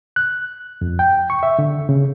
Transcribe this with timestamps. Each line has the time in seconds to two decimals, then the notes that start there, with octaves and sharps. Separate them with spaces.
0.16 F#6
0.81 F2
0.99 G5
1.30 C#6
1.43 E5
1.59 D3
1.89 C#3